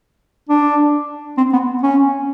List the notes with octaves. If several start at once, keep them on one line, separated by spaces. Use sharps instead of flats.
D4
C4
B3
C#4